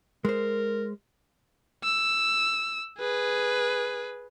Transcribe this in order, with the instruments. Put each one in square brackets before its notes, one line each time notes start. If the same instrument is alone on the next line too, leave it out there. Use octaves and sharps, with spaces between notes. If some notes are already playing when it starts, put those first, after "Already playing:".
[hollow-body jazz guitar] G#3 C5 [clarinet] A#4
[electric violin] E6
G#4 B4